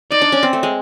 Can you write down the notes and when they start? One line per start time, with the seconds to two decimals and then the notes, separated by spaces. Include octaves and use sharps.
0.11 D#4 D5
0.22 D4
0.32 C#4
0.43 C4
0.53 A3
0.63 G#3